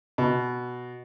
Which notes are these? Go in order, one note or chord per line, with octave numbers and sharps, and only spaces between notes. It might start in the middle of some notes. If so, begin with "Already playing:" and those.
B2